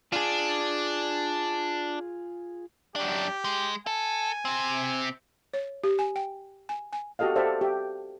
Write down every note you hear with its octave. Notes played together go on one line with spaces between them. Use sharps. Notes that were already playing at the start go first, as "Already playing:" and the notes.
D4 F4 G#4
F#2 D4 G4
G#3
A4 G#5
C3 C4
C#5
G4
G#5
G5
G#5
G#5
F#4 G4 A4 D#5 F5
G4 A4 C5 D5 E5 F5
G4 E5